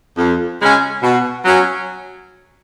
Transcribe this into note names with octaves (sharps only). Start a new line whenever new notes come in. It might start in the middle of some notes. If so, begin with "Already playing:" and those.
F2
C#3 G#3 C#4 F#4
B2
F#3 C#4